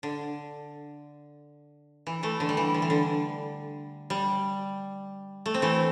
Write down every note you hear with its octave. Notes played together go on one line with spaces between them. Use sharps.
D3
E3
E3 A3
D3
G3
E3
D3
E3
D3
G3
A3
C4
E3 A3